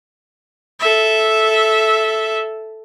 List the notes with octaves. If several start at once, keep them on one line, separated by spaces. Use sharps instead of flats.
A4 E5